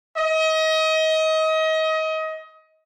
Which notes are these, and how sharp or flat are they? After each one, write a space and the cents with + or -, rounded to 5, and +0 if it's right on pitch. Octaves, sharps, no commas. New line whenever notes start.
D#5 +30